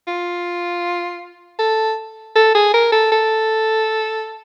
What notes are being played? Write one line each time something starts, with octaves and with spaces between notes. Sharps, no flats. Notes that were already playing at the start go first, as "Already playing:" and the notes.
F4
A4
A4
G#4
A#4
A4
A4